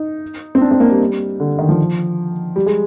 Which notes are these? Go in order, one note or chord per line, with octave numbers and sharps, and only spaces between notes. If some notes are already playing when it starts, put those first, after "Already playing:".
Already playing: D#4
C4
D4
C4
A#3
G3
D3
D#3
F3
G3
G#3